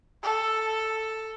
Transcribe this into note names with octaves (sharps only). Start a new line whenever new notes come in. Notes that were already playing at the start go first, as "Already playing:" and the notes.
A4